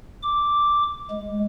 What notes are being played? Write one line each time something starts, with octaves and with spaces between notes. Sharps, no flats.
D6
G#3